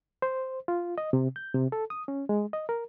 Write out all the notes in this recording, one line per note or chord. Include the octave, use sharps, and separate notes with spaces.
C5
F4
D#5
C3
G6
C3
A4
D#6
C#4
G#3
D#5
A#4